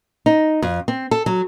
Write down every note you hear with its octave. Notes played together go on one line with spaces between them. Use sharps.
D#4
F2
C4
A4
F#3